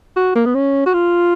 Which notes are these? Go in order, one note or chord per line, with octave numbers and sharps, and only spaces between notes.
F#4
A#3
B3
C#4
F#4
F4